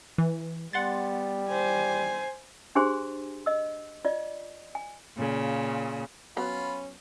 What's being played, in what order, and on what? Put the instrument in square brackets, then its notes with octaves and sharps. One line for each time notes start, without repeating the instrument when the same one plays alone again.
[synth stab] E3
[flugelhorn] G3 [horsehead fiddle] B3 [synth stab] F#5 C6 A6
[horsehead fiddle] C5 G#5
[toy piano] D4 G4 G#4 C5 G#5 C6
D#5 E6
F4 D5 D#5
G#5
[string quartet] A#2 C#3
[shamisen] F#3 B3 [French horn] C#4 [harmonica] F4 B5